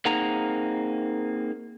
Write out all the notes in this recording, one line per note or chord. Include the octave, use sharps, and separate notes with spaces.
A#3 C4 D#4 G#4 F#5 A#5